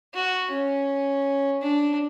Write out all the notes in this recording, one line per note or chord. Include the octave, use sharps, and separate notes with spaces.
F#4
C#4
D4